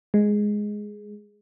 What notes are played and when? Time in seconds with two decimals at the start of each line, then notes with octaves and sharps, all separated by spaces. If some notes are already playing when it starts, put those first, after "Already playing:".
0.14 G#3